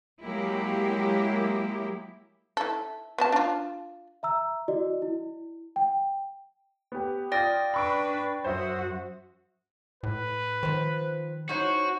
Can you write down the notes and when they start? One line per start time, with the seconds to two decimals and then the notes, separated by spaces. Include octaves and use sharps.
0.23 F#3 G#3 A#3 E4 G4
2.57 E4 A4
3.18 B3 F#4 A5
3.32 D4 F4
4.23 E5 A#5 E6
4.68 E4 F#4 D5 D#5
5.02 E4
5.76 G5
6.92 B3 G4
7.32 F4 D5 G5 D#6 A#6
7.74 D4 B4 B5 C#6 D7
8.44 F#2 F#4 C5 E5 D#6
10.03 A2 B4
10.63 D#3 F3 C5
11.49 C#4 D#4 E4 F#4 C5